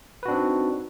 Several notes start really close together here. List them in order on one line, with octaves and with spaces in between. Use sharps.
B4 F#4 D4 C4 D#4